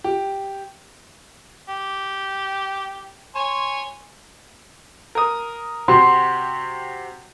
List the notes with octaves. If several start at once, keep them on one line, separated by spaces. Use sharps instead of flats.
G4
G4
C#5 G#5 C6
A#4 D#6
C3 F#4 G4 C6